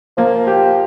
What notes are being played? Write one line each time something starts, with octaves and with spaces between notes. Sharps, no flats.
F3 A#3
G4